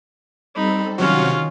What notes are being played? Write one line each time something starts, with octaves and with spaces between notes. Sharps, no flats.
G3 C4 D#4 A4 B5
C3 D#3 F#3 C#4 F4 F#4